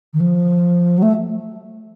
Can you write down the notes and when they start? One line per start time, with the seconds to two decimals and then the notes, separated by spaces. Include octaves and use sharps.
0.13 D#3
0.20 F3
0.97 F#3
1.02 A3